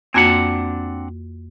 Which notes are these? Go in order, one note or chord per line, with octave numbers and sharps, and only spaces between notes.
F2 A#3 C4 D4 F#4 F#5